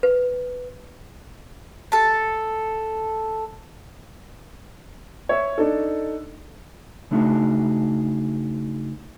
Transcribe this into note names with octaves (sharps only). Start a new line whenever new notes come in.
B4
A4 A5
C#5 E5
D4 D#4 A4
C#3 A3 D4 D#4 F#4 G#4